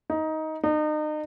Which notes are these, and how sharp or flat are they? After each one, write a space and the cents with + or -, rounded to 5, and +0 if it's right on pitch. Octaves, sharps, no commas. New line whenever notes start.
D#4 +15
D#4 -35